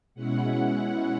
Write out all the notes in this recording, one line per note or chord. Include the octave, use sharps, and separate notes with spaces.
B2 G#3 C#4 E4 F#5